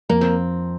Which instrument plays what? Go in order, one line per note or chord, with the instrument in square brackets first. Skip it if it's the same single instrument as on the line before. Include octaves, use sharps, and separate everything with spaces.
[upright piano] F2 [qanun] A#3
[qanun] C4